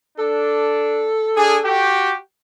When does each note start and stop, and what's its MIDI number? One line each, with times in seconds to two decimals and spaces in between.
0.18 1.08 62
0.18 1.92 69
1.36 1.58 62
1.36 1.58 68
1.65 2.15 66
1.65 2.15 67